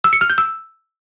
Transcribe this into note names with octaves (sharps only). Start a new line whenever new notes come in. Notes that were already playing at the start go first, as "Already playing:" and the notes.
E6
C#7
F6
G6
E6